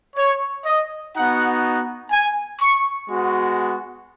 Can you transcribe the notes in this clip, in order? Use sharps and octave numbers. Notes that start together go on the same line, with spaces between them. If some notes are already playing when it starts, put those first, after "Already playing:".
C#5
D#5
B3 D#4 F#4 F#5
G#5
C#6
G#3 B3 F#4